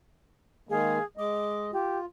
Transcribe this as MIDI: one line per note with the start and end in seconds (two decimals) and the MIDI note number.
0.69 0.99 51
0.69 0.99 56
0.69 0.99 58
0.69 1.02 68
0.69 1.02 77
1.17 1.71 56
1.17 1.71 75
1.17 1.63 86
1.73 2.06 65
1.73 1.98 67